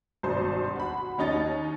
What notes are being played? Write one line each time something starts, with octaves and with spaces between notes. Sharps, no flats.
G#1 G2 B2 G3 C5
F#4 B5
D#2 C#4 D#4 A6